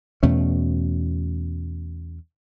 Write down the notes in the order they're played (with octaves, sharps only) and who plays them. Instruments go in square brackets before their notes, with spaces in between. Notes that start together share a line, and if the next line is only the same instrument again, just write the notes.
[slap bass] E2 B2 A3 C#4